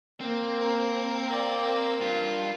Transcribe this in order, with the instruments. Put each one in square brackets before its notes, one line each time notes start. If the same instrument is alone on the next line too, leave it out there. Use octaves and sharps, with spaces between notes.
[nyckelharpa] A#3 [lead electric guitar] C4
[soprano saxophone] A#4
[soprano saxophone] A#3 [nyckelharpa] D5
[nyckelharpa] A#4
[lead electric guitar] G2 [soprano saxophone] F4